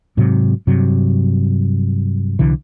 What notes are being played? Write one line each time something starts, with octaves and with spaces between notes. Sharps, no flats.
G#2 C3 F#3
G2 C3 F#3
C2 D3 E3